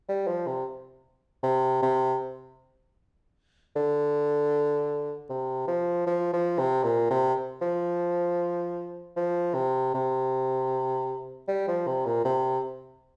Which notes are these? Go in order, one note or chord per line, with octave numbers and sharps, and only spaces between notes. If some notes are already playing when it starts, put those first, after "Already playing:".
G3
F3
C3
C3
C3
D3
C3
F3
F3
F3
C3
A#2
C3
F3
F3
C3
C3
G3
F3
C3
A#2
C3